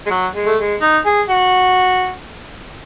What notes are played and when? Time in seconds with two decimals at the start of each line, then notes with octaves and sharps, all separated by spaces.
0.06 G#3
0.10 F#3
0.34 G#3
0.46 A3
0.58 G#3
0.81 D#4
1.05 G#4
1.29 F#4